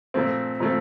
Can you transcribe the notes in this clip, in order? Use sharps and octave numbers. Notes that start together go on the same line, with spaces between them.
A#2 F3 A3 C4
A#2 F3 A3 C4